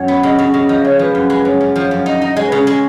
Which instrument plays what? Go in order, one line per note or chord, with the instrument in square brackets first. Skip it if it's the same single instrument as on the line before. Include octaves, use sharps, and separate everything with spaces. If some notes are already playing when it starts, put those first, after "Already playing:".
Already playing: [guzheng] F#2 [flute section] C#5
[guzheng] B3
[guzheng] C#3 [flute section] D#5
[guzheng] C#3
C#3
F3
[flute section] D#5
[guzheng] G#3 [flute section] C#5
[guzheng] F3 [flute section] B4
[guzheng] F#2
G#3
[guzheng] F#2 [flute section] C#5
[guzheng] F#2
F3
[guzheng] F#2 [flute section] C#5
[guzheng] D#4 [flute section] D#5
[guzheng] D#4
[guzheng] G#3 [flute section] C#5
[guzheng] C#3 [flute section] B4
[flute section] C#5
[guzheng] G#3